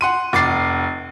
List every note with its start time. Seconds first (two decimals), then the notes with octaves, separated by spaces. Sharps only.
0.01 F#5 C6 D#7
0.33 F1 D6 A6 C7